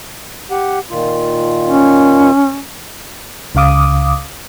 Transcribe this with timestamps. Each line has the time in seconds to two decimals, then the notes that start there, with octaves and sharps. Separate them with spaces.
0.51 G4 F#5
0.90 A#2 D#3 F4
1.65 C#4
3.55 C#2 C#3 F5 D6 D#6